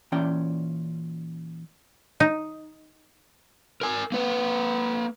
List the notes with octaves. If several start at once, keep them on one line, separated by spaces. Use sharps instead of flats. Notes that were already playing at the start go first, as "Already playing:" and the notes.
A#2 E3 C#4 D5 G5
D#4
A#4 G#5
A#3 B4